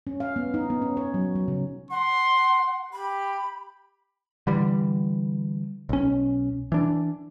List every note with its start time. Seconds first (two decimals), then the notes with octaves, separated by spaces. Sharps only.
0.07 C#4
0.20 F5
0.36 B3
0.54 D#4
0.70 B3
0.82 C#4
0.97 C#5
1.14 F#3
1.35 F#3
1.48 C#3
1.91 F#5 C6
2.93 G4 B5
4.47 D3 E3 G3
5.89 B1 C#4
6.72 E3 D4